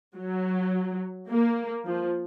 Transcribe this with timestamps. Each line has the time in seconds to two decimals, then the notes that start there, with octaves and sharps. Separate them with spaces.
0.16 F#3
1.29 A#3
1.85 F3